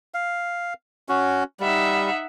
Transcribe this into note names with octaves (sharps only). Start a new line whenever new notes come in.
F5
C#4 F#4
G3 D#4 E5 F#5